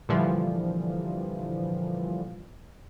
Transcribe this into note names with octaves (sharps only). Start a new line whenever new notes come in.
A#2 D3 E3 F3 G3